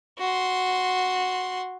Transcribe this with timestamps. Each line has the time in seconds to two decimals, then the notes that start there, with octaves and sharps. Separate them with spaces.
0.18 F#4 C6